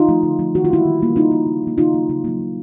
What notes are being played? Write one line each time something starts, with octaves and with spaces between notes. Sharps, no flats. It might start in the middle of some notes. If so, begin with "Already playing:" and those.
Already playing: D#4 F4
F3 A3
D3
F3 A3
D#3 F#4
F4
G3 A#3 E4 F#4
D#3
G3 A#3
C#3 D#4 F4
F3 A#3
C#3
F3 A#3
C#3 D#4 F4
F#3 A#3
C#3
F#3 A#3
C#3